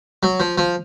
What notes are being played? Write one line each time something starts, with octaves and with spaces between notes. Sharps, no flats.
F#3
F3
F3